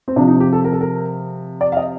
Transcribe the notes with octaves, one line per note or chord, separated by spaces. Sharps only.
C4
C3 F3 D4
D#4
G4
A4
A#4
A4
A#4
D5
F5
D#5